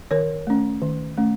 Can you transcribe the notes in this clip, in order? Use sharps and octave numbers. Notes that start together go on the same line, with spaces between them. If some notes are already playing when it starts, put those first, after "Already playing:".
D#3 A#4 C#5
A3 C#4
D#3
A3 C#4